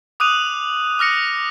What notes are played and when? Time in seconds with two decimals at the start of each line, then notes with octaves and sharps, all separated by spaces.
0.20 D6 D#6 F#6 D#7 F7
0.99 D6 F6 A#6 C#7